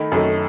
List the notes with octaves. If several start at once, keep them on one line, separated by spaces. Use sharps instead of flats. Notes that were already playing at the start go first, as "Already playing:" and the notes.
Already playing: D#3 A3 B5
F#2 D#3 A3